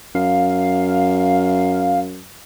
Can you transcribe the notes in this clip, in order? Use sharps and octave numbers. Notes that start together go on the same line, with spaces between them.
F#2 F5